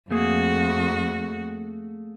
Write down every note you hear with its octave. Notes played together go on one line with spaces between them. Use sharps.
F2 A3 A#3 F#4 G#4